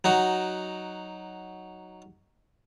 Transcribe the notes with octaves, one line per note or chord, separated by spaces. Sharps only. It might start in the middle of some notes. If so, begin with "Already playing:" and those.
F#3 D#4 F#4